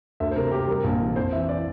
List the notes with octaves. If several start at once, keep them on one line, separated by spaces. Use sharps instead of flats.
D2 E5
C5
C3 A#4
C3 G4
G3 A#4
A#1
E3
F2 C5
E3 E5
E3 D5